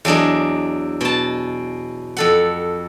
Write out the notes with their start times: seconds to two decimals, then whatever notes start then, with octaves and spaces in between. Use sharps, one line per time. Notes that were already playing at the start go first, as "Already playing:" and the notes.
0.05 E2 F#3 D4 D#5
1.01 B2 A5
2.17 F2 A4 F#5